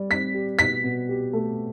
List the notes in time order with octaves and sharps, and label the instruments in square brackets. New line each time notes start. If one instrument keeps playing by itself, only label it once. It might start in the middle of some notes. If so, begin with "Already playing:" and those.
Already playing: [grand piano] G3 D5
[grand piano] C4 [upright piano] B6
[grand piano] G4
[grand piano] B2 [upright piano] B6
[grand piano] B2
G4
A3